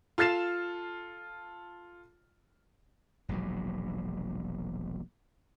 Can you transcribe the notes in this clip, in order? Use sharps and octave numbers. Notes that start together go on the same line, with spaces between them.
F4 A4 F6 A6 C7 E7
E1 A#1 G#2 F#3